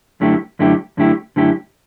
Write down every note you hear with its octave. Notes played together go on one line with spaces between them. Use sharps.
F#2 D3 A3 E4 G4
F#2 D3 A3 E4 G4
F#2 D3 A3 E4 G4
F#2 D3 A3 E4 G4